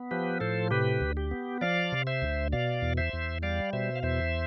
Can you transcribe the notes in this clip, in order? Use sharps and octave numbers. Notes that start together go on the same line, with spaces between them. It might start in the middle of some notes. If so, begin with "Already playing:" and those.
Already playing: B3
F3 G4 B4
A2 A4 C5
C3 G4 B4
D2
G4
B3
F3 D5 F5
C3
C5 E5
D2
B2 D5 F5
E2
C5 E5
E2
G3 D5 F5
B2 C5 E5
F5
E2 C5 E5